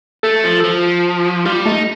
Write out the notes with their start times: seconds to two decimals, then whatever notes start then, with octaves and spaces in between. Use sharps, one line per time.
0.23 A3 A4
0.44 F3
0.64 F3
1.46 G3 F4
1.66 A3 D#4